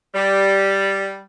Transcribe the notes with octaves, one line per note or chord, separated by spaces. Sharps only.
G3